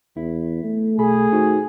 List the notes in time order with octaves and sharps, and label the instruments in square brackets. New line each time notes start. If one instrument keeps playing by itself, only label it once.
[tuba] E2 [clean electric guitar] E4
[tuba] A3
[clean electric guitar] B1 B5 [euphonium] G#4
[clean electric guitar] D#4 F#4 C5